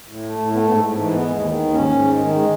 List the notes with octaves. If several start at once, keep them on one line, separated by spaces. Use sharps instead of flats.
A2
A3
A2
A3 B3
G#2 B3
G#2 A3
E3
G#3 B3
D#2
D#3
D#2
G#2 C#4
G#2
G#3
D#3
G#3